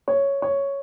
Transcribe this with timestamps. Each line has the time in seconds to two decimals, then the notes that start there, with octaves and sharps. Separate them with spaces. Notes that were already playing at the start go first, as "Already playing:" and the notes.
0.08 C#5
0.42 C#5